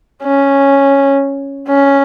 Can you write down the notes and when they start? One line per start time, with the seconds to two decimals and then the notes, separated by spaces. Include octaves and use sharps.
0.23 C#4
1.68 C#4